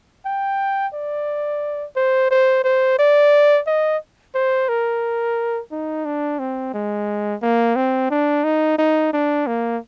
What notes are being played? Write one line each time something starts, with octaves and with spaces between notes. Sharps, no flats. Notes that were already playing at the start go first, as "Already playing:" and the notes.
G5
D5
C5
C5
C5
D5
D#5
C5
A#4
D#4
D4
C4
G#3
A#3
C4
D4
D#4
D#4
D4
A#3